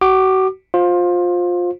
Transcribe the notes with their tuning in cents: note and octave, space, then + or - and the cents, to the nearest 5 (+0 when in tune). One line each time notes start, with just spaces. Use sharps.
F#4 +35 D6 +20
F4 +20 C5 +10